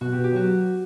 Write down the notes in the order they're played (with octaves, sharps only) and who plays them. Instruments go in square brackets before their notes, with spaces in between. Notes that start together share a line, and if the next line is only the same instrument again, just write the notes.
[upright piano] B2 [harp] F#4
[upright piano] B3 [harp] G4
[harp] G4
[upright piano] F#3 [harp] F#4